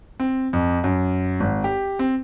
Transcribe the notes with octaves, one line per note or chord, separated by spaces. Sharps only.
C4
F2
F#2
G#1
G4
C4